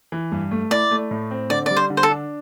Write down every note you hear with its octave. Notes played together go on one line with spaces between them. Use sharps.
E3
G2
A3
E4 D5
A3
A2
C4
D3 D5
G3 D5
C5
D3
C5
A4
D4